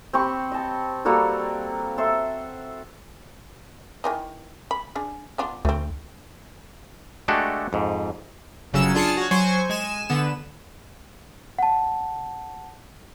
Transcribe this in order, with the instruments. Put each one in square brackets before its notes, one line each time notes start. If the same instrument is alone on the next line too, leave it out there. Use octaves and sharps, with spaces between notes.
[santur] C4 G4 B5 C#6
D#5 A5
G3 A#3 F#4 A4
A4 C5 E5
[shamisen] D#3 E3 D#4
B5
D4 G#4
B3 D4 F4
[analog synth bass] D2 [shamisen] A3 C4
[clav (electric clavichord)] G#3 A3 D4 F#4 G4 A4
F2 G#2
[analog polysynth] G1 C#3 F#3 C#4 E6 E7
D4 F4 G#4 A5 C7 C#7
F#4 C#5
F#3 C5 G#5 C#6
G#3 G#5 E7
D3 B3 E7
[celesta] F#5 A5